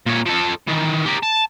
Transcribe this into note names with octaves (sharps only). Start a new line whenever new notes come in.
A#2 C#5
F3 A4
D#3 E3
G4 A#4
A5